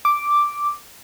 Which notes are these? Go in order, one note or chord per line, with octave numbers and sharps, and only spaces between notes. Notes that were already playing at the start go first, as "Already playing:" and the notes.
D6